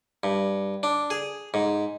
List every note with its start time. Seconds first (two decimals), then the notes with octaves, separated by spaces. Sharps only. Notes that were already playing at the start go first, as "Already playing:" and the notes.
0.23 G2
0.83 D4
1.10 G#4
1.54 G#2